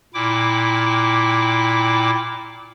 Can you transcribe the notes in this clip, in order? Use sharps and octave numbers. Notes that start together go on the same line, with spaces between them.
A#2 E4 G5 D6